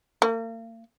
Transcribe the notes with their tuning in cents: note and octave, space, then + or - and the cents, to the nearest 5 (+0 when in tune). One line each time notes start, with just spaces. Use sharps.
A#3 -40